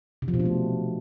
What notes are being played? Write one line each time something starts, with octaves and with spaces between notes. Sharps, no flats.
C3
F3
B2
D4
A3